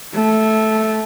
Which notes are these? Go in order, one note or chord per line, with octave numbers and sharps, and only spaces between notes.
A3